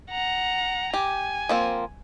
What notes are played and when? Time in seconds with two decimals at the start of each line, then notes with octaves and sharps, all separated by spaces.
0.11 F#5 A#5
0.94 G4 G#5
1.49 F3 A#3 C4